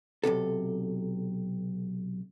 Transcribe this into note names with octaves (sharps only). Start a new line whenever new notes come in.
B1 G#2 C3 A4